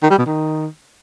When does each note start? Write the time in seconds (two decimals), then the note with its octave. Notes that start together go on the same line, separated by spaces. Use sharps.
0.03 D#3
0.10 G3
0.18 B2
0.26 D#3